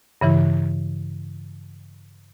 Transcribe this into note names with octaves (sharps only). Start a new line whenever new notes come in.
G2 C#3 E3 E4